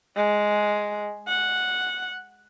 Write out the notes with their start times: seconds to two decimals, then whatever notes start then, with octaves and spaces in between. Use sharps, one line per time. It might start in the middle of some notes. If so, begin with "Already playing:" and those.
0.16 G#3
1.28 F#5